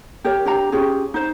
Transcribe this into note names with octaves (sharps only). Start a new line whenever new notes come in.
G4 A#4 C#5
D4 G4 A#5
C#4 F4 G4 G#4
D#4 C5